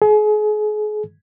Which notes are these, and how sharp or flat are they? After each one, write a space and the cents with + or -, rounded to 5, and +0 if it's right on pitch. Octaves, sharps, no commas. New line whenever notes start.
G#4 +35